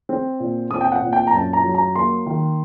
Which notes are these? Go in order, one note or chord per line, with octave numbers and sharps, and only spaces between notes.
C4
A#2
C4 D#6
G5
F#5
A#2
G5
A#5
F#2 A5
A#5
F#3
A#5
A#3 C6
D#3